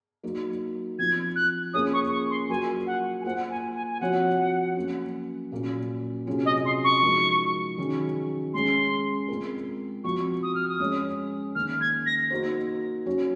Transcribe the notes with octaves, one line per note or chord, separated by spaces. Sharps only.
F#3 A#3 D#4
F3 C4 F4 G#6
F#6
A#3 C#4 F4 G#4 C#5 D#6
C#6
C#6
C6
F#3 A#3 F4 A#4 G#5
F#5
G#5
A#3 F4 C5 F#5
G#5
G#5
G#5
F3 C4 F#4 C#5 F#5
F#3 A#3 C#4
A#2 F#3 A#3 C#4
C3 F#3 C#4 F4 G#4
D#5
C6
C#6
F3 G#3 D#4 F#4 A#4
D#3 F#3 C#4 G#4
G#3 C#4 G#4 C6
G#3 C4 F4 A#4
F3 C4 F#4 C#6
D#6
F6
D#6
G#3 C#4 G#4 C#5
D#3 A#3 C#4 F6
G#6
A#6
A#3 D#4 F#4 C5
F#3 C#4 F#4 C#5